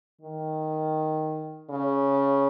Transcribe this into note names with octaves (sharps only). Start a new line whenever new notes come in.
D#3
C#3